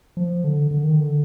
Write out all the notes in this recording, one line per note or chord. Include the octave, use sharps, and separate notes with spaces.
F3
D3
D3
D#3
D3